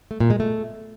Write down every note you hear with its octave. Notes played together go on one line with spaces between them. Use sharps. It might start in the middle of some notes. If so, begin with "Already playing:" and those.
A3
A#2
G#3
A3